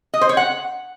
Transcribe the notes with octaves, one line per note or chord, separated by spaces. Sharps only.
D#5
C5
C#5
F#5